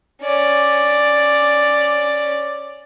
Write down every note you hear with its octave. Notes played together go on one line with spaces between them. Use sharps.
C#4 D5